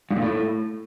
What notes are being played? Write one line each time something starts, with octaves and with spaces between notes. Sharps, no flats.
G2
A#2
A2